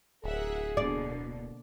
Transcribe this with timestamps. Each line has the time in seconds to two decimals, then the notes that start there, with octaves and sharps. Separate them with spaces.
0.24 D1 G#4 A#4 E5 F#5
0.77 B2 D3 A#3 D5